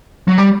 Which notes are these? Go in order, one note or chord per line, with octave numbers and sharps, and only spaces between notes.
F#3
G3